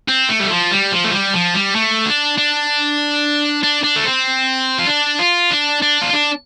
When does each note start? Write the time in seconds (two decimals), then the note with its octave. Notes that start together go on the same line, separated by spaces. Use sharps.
0.09 C4
0.29 A3
0.40 G3
0.50 F3
0.71 G3
0.92 F3
1.04 A3
1.12 G3
1.33 F3
1.54 G3
1.76 A3
2.06 D4
2.38 D4
3.63 D4
3.84 D4
3.96 A3
4.05 C4
4.79 F4
4.88 D4
5.19 F4
5.50 D4
5.82 D4
6.02 F4
6.13 D4